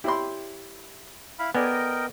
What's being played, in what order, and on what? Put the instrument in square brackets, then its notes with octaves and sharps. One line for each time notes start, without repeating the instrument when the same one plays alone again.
[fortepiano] E4 B5 C6 [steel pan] G4 C#5
[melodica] E4 F5 B5
[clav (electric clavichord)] B3 [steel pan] A4 D5 G#5 [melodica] A#4 D#5 G5